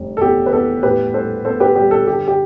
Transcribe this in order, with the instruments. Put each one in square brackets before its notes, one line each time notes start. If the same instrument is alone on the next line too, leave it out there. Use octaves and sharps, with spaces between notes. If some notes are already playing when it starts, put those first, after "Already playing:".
Already playing: [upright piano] F1 G3
A4
E2 G4
B4
E2 A4
A2 G4 B4
G3 A4 C5
B3 A4 C5
G4 B4
G3 G4
A4
D3 G4
G4